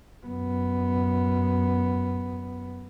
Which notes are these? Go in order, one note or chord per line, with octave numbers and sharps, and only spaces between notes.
F#2 B3